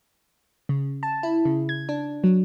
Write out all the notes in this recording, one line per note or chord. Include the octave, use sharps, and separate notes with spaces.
C#3
A5
E4
C#3
G#6
D4
F#3